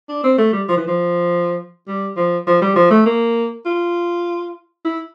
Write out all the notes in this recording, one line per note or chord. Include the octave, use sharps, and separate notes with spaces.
D4
C4
A3
G3
F3
E3
F3
G3
F3
F3
G3
F3
A3
A#3
F4
E4